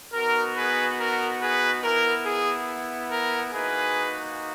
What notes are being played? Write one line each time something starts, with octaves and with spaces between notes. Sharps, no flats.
B3 D#4 F#4 A#4
G#4 B4
A#4
G#4 B4
B3 E4 A#4
G#4
A#4
A#3 D#4 F#4 G#4 B4